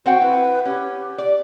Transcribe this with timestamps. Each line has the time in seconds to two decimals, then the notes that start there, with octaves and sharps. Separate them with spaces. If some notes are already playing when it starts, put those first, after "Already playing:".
0.06 C4 F#4 C5 F#5 G5
0.21 E4 B4
0.65 C#4 G4
1.18 D5